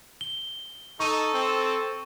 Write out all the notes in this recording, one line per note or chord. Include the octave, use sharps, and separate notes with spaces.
G7
D#4 A4 C#6 D#7
C4